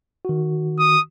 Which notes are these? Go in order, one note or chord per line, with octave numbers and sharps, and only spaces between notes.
D#3 F#4
D#6